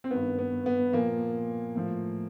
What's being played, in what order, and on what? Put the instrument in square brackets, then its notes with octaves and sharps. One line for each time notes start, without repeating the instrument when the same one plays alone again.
[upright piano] C4
G2 D#3 B3
B3
B3
A#2 F3 A#3
A2 F3